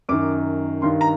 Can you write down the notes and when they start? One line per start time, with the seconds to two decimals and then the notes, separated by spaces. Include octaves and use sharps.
0.09 F#2 D#3 D6
0.82 G2 D#3 C6
1.01 A#5